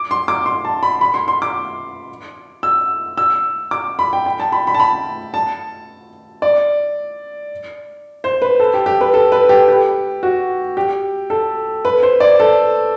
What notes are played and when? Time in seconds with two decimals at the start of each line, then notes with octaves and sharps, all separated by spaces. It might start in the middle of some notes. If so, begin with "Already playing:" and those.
Already playing: D6
0.11 C6
0.28 D6
0.46 C6
0.65 A5
0.83 B5
1.01 B5
1.14 C6
1.28 C6
1.42 D6
2.63 E6
3.17 E6
3.71 D6
3.99 B5
4.13 G5
4.26 G5
4.40 A5
4.52 B5
4.67 B5
4.74 A5
4.80 B5
5.34 A5
6.42 D5
8.24 C5
8.42 B4
8.60 A4
8.74 G4
8.86 G4
9.01 B4
9.14 A4
9.32 B4
9.49 G4
9.68 G4
10.23 F#4
10.77 G4
11.30 A4
11.85 B4
12.03 C5
12.20 D5
12.40 A4